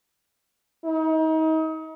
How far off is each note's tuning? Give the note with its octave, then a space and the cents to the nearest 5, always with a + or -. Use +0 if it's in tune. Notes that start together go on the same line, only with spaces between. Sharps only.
D#4 +35